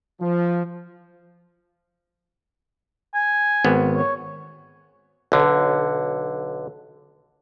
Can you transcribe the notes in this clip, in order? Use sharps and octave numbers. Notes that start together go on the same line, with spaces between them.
F3
G#5
G#1 B3
C#5
B1 D3